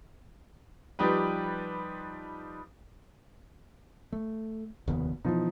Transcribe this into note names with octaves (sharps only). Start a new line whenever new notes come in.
F3 G3 D#4 G4 B4
A3
F1 D#2 B2
B2 E3 F3 D#4